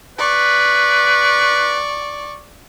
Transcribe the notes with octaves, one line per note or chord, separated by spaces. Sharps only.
B4 D5 C#6